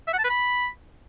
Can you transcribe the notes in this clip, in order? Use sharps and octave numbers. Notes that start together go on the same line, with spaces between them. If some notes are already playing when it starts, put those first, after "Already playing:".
E5
F#5
A5
B4
B5